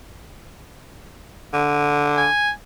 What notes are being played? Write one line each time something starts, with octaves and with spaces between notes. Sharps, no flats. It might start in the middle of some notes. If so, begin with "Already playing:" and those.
D3
G#5